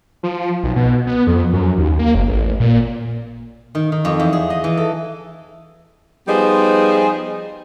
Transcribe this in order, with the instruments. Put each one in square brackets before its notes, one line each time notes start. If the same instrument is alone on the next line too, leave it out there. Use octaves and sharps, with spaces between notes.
[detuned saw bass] F3
B1
B2
B3
F2
F#2
D#2
A#3
F#1
A1
A#2
[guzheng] D#3
D#3
F2
E2
G#4
D#5
E3
A4
[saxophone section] F3 G3 B3 D#4 G#4 C5